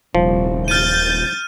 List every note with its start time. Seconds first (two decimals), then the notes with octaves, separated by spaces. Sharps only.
0.15 D#1 C2 F3
0.68 F6 G6 A6 D#7